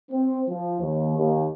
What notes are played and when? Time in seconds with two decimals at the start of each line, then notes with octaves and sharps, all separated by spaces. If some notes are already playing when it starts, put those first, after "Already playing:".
0.11 C4
0.48 F3
0.80 D#2
1.17 D#2